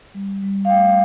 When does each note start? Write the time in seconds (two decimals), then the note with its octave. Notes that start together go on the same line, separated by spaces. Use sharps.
0.14 G3
0.43 G3
0.65 F5
0.70 A3 G5